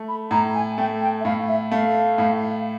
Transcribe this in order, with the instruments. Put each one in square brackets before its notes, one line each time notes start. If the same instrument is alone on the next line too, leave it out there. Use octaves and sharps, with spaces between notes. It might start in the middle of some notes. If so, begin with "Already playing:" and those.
Already playing: [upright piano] A3
[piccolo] B5
[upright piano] A2 [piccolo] A#5
[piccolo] G#5
[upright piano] A3 [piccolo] G5
[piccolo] G5
E5
[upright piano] A2 [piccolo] F5
[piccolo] E5
[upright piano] A3 [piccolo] F5
[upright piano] A2